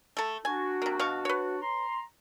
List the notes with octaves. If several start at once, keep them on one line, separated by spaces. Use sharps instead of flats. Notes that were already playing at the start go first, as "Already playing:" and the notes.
A3 A4
D4 F#4 G#5
C3 A#3
B2 F5 C#6
B4 C#5
A#5 C6